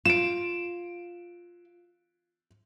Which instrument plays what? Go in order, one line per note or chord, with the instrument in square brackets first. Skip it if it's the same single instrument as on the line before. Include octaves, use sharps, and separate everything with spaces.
[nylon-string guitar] F4 [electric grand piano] D7 E7